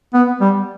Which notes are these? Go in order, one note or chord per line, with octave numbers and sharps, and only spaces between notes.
B3
G3